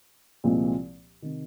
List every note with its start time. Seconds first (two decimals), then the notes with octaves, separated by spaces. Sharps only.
0.44 C2 A#2 F3 G#3 C4
1.22 C3 D#3